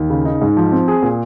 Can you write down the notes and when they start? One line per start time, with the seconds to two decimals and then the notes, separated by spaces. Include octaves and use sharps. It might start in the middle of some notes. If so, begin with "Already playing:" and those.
Already playing: D#2
0.10 C#3
0.25 D#4
0.42 G#2
0.57 F3
0.72 C4
0.88 G#4
1.03 A#2